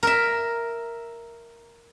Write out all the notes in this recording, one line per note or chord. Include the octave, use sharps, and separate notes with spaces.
A#4 E5